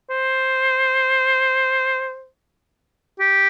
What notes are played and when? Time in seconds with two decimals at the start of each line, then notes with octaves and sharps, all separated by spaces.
0.10 C5
3.20 G4